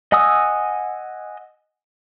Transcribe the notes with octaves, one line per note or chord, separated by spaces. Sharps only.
D#5 F#5 G#5 D#6 E6